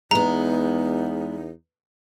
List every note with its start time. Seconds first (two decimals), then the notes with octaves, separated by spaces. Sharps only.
0.11 E2 G#3 B3 D#4 A#5